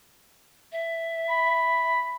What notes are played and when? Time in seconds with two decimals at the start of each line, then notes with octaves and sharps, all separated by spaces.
0.72 E5
1.29 B5